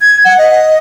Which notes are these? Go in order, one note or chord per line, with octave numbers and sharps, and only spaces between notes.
G#6
F#5
D#5